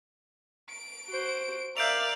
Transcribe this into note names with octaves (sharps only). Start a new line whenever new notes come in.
D7
F#4 C5
A#4 D5 E5 F5 G6 D7 F7